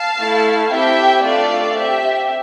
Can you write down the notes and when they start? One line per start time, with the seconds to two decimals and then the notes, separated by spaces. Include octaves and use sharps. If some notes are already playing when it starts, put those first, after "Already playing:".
Already playing: F5 A5
0.18 A3 E4 A4
0.70 C4 E4 G4 E5 G5
1.24 A3 D4 F4 A4 D5 F5
1.76 C4 G4 E5